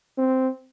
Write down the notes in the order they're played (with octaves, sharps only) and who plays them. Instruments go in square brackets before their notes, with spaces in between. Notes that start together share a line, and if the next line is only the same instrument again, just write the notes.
[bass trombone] C4